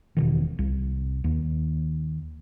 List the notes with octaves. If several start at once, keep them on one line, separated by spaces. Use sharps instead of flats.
E1 B2 D#3
C2
D#2